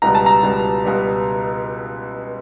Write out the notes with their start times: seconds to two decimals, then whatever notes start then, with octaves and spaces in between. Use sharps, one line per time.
0.02 C#2 B2 G3 A#5
0.15 A5
0.26 A#5
0.43 C#2 B2 G3
0.85 C#2 B2 G3